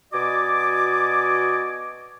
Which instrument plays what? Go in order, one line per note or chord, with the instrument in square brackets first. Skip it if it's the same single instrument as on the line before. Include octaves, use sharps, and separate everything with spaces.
[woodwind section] B2 F#4 D5 D#5 G#5 D6